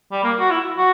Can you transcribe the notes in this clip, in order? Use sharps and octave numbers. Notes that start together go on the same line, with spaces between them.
G3
A#3
F#4
E4
F#4